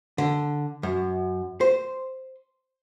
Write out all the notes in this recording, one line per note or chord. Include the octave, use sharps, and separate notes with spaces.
D3
F#2
C5